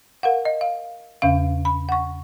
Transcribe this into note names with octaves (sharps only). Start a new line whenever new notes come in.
A#4 F5 F#5
D#5
F5
E2 C#3 C#4 F5
B5
F#5 C#6